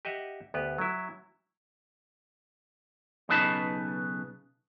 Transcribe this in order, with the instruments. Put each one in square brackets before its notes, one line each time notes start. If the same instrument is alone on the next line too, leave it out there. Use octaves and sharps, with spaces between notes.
[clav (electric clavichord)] G4 D#5 E5 F#5
D2 B3 G4 B4
F#3 E4
[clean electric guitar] B1 C#3 D#4 B4 A5 B5